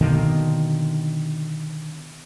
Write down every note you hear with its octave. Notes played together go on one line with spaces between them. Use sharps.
B2 D3 D#3 A#3